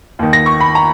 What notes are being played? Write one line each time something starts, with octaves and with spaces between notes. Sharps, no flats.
D#2 D#3
A#6
C#6
B5
A#5